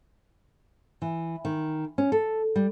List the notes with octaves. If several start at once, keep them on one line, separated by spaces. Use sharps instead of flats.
E3
D#3
C#4
A4
G3